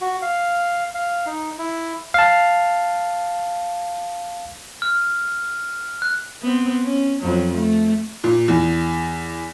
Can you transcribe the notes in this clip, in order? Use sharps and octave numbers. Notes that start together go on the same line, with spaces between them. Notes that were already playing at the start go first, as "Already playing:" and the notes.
F#4
F5
F5
D#4
E4
F5 A5
F6
F#6
B3 C4
C#4
F2 F#3
A3
A#2
E2